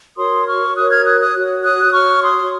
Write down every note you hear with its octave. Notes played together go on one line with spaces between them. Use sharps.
F#4 A#4 C#5 C6 D#6
C#6 F6
F#4 A#4 C#5 D#6 F#6
F6 G#6
D#6 F#6
D#6 F#6
F#4 C#5
D#6 F#6
F#4 C#5 C#6 F6
C6 D#6